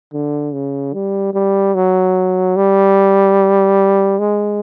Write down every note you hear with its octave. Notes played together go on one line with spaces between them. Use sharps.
D3
C#3
G3
G3
F#3
G3
G#3